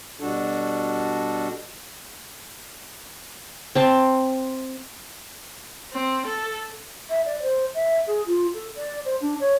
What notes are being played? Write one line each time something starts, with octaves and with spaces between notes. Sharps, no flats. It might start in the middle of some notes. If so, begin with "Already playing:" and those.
B2 G3 D4 F#4 A4
C4 A5
C4
A4
E5
D5
C5
E5
G#4
F4
A4
D5
C5
D4
C#5